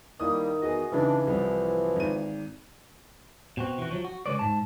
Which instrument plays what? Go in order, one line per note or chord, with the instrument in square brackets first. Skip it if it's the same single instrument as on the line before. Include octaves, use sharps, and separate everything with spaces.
[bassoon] D#3 [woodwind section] G3 A#3 [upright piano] E4 D#6
[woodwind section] E2 B3 D#5 [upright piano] F#4 G#4
[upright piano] C#3 D#4 [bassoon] E3 [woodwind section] D4
[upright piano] C2 [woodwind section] F3
[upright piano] G#1 D#7
[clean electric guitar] B2 C4 F#4
E3 F#4
F3 F#3
F#4
C#3 G#3 B4 C#5 D5
G#2 A5